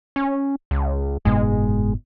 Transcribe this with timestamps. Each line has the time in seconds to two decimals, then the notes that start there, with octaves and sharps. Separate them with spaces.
0.16 C#4
0.71 C#2
1.25 F#1 G#2 B2 G#3